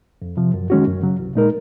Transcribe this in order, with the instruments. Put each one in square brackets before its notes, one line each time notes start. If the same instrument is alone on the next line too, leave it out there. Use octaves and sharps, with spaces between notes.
[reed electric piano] F2
C3 F3
F#2
D#3 G#3 C#4 F#4
F#2
C#3 F#3
C2
A#2 G#3 D#4 A#4